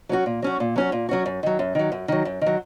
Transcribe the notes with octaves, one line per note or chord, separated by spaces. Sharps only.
F#3 C#4 F#4
A#2
F#3 C#4 F#4
A#2
F#3 C#4 F#4
A#2
F#3 C#4 F#4
F#2
D#3 F#3
F#2
D#3 F#3
F#2
D#3 F#3
F#2
D#3 F#3